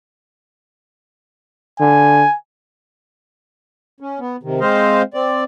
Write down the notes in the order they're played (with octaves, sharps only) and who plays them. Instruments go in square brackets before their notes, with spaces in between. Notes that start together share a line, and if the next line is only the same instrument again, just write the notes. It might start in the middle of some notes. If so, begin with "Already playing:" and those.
[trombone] D3 [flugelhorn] G#5
[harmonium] C#4
B3
C3 D#3
G#3 C4 C5 D#5 F5
C4 D5